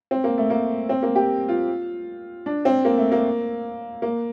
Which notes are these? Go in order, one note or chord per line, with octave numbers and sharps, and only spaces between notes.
C4
A#3
A3
A#3
C4
A#3
G4
F4
D4
C4
A#3
A3
A#3
A#3